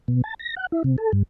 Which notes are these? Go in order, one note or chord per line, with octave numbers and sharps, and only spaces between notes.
B2
A5
A#6
F#5
E4
C3
A4
G2